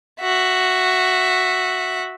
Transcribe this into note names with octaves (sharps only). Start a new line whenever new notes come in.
F#4 E5